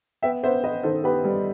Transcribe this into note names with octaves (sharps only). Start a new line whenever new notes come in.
B3 E5 G5
B3 C5 E5
B3 B4 D#5
D#3 A4 C5
B3 G4 B4
G3